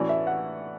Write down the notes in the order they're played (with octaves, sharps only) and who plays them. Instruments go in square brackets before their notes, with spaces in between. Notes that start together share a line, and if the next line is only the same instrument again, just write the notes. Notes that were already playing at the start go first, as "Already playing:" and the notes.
Already playing: [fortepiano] A2 E3 A3 C#4 F#4 [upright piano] D5
[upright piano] E5
F#5